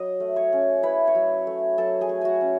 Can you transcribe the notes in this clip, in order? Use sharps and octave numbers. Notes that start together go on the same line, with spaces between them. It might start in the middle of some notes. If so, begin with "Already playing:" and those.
Already playing: F#3 D#5 D#6
A3
C#5 C#6
C#4
E4 B4 B5
C#5 C#6
F#3
A3
F#3 A4 A5
G#4 G#5
A3
F#4 F#5 G#5
C#4